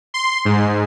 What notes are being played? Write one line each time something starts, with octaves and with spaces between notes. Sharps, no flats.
C6
G#2